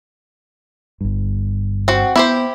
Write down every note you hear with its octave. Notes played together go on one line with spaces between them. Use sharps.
G1 G2
C4 F#4
B3 E4 G4 C5